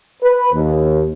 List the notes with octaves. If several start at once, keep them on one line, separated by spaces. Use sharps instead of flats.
B4
D#2